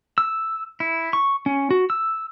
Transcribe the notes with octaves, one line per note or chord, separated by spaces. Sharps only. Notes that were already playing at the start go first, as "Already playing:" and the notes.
E6
E4
C#6
C#4
F#4
E6